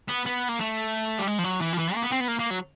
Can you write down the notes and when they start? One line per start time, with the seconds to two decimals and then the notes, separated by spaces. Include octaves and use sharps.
0.08 B3
0.26 B3
0.48 A#3
0.60 A3
1.18 G3
1.27 G#3
1.38 F3
1.44 F#3
1.61 E3
1.73 F3
1.78 E3
1.94 A#3
2.02 B3
2.11 C4
2.20 B3
2.28 A#3
2.39 A#3
2.51 F#3